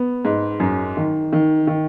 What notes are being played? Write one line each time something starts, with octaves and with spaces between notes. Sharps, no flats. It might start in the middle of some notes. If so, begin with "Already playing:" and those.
Already playing: B3
G#2
F#2
D#3
D#3
D#3